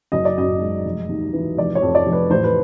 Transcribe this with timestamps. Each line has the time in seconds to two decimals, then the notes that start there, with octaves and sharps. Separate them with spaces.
0.12 F#1 D#5
0.25 D5
0.37 F#2 D#5
0.61 G#3
0.85 F1
1.09 D#2
1.33 E3
1.57 F1 D5
1.75 C#5
1.82 F2
1.95 D5
2.06 F1
2.13 B4
2.30 A1 C5
2.44 B4